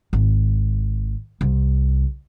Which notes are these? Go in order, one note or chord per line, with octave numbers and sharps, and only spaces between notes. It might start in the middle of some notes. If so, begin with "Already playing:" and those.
G#1
C2